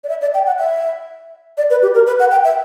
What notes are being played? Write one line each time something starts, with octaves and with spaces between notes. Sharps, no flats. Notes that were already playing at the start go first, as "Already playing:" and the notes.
D5
E5
D5
G5
F#5
E5
D5
B4
G4
A#4
B4
F#5
G5
E5